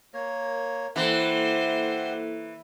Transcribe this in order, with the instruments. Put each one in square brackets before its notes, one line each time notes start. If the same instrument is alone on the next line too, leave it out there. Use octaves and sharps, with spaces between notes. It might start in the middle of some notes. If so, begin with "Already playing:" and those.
[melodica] A#3 C#5 [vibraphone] A#4
[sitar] E3 [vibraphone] A#3 E4 A4 [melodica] G4 E5 F#5 [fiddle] C5